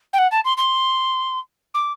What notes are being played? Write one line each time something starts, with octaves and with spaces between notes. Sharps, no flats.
G5
F#5
A5
C6
C6
D6